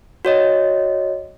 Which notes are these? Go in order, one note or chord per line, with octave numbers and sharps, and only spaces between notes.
F#4 C#5 D#5